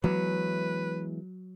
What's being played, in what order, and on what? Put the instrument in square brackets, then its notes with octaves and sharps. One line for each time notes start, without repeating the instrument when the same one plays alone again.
[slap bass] E3 G#3 B3 [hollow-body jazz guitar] F#3 [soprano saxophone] B4